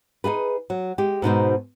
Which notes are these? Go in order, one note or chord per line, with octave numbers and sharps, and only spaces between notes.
D#4 F4 G#4 B4
F#3
G#3 G4
G#2 B2 D#4 C5